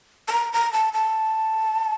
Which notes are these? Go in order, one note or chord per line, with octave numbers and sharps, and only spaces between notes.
A5
A#5
A#5
A5
A5